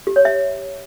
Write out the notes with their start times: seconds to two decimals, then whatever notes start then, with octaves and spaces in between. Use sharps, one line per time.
0.07 G4
0.16 C#5
0.25 E5